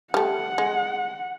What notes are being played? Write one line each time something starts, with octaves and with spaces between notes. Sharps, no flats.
G3 A3 F#5
G#3